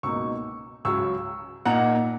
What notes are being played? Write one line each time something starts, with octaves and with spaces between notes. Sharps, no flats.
C#2 B2 A#3 D#4 C#6 E6
C#2 C#3 F#3 C#6 E6
A#2 A#3 D#4 F#5 A#5